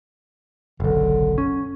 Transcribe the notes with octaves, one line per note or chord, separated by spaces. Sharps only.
F#1 B1 D3
C#4